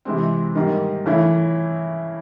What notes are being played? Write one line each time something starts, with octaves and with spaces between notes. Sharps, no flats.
C3 E3 G#3 C4
G#2 D#3 G3 A#3 D#4
C#3 E3 A3 C#4 E4